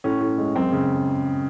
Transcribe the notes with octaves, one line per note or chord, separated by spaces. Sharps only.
A2 C#4
A2
G#3
F#2 C4
C#3